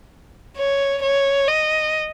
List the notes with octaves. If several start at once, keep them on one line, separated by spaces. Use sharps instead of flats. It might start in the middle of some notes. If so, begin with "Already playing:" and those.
C#5
C#5
D#5